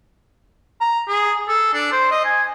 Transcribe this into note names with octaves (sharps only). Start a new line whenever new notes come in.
A#5
G#4
A4
D4
C5
D#5
G#5